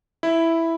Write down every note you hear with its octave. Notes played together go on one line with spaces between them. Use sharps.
E4